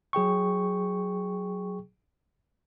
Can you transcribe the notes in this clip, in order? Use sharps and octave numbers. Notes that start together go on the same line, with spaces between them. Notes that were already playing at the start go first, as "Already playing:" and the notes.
F#3 G#4 G5 C#6